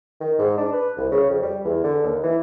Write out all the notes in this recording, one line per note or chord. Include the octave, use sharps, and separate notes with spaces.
D#3
G#2
D4
B4
C2
C#3
F2
G3
E2
D3
D#2
E3